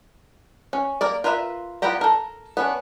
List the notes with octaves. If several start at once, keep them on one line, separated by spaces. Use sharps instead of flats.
C#4
A#3 A#4 D5
F4 A#4 B4 C#5 E5
B3 E4 F4 G4 A#5
A4 A#4
B3 C#4 D4